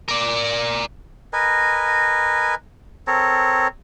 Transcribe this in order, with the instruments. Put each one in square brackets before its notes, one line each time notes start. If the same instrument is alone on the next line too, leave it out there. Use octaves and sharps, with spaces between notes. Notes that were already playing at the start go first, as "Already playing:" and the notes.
[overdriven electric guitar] A#4 D5
[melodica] A#4 B4 D#5 G#5
C4 A4 A#4 C#5